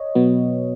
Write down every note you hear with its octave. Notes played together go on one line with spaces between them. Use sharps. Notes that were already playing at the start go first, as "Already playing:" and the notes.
Already playing: C#5 D#5
B2 F#3 B3